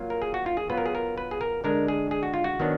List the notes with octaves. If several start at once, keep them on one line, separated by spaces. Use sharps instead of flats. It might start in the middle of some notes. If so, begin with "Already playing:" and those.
Already playing: F#3 A#3 F4
A#4
G#4
F#4
F4
G#4
F#3 B3 F4 B4
A#4
G#4
A#4
B4
G#4
A#4
D3 G#3 D4 A#4
G#4
G#4
F#4
F4
F#4
D#3 F#3 B3 D4